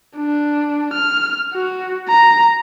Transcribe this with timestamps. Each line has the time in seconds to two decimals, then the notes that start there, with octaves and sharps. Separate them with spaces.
0.17 D4
0.94 F6
1.54 F#4
2.09 A#5